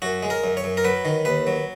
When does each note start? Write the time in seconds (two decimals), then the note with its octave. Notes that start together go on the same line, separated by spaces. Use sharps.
0.02 F#2 F#4
0.23 G#3
0.30 A#4
0.44 F#2
0.57 C#5
0.64 F#2
0.77 A#4
0.84 F#3 B4
1.05 D#3
1.25 D#2 B4
1.47 F#3